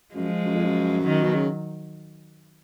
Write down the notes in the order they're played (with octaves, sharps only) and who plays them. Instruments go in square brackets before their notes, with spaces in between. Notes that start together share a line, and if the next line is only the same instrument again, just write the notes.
[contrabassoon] F#2 [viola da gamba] F3 G#3
[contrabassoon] F#2
F2
F#2
[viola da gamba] D#3 F#3
[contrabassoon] B2
C#3